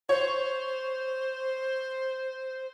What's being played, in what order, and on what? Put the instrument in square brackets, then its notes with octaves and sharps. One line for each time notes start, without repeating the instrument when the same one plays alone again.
[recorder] C5 [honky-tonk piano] C#5